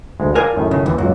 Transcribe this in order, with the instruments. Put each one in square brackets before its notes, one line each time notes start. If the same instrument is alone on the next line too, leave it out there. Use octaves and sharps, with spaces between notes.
[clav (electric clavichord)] D2 G#3
[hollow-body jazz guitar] A#4 G#5 [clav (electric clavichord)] D5 F5 F#5
[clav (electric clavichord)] F#2 A2 D#3
[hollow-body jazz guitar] C#3
[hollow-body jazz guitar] D#2 [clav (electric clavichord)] E3
[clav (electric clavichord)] C#2 A#2 F#4 [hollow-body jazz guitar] F#2